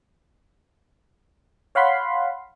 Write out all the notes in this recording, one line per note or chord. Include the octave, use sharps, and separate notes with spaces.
C#5 F5 F#5 B5 C6